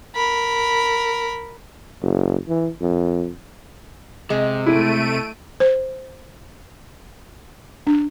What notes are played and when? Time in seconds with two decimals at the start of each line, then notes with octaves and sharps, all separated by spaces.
0.15 A#4 B5
2.02 F#1
2.48 E3
2.81 F2
4.30 C3 G#3
4.66 A3 E4 D7 D#7
5.60 C5
7.87 D4